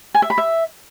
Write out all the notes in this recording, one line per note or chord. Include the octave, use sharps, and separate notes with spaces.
G#5
E5
B5
E5